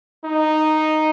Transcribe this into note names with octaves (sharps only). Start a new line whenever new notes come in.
D#4